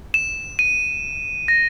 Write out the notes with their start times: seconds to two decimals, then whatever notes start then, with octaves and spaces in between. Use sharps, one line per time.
0.14 E7
0.59 D#7
1.48 A#6